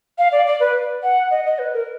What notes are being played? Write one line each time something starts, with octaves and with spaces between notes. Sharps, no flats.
F5
D5
D5
B4
F#5
D#5
D#5
B4
A#4